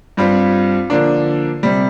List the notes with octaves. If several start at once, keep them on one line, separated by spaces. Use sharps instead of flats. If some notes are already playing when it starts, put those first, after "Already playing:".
G2 G3 C4 F4
D3 F3 A#3 D4
C3 G3